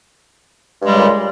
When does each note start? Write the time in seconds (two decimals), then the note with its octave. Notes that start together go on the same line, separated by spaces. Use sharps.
0.78 G2
0.83 G#3
0.88 G3
0.93 C#3
0.98 A#2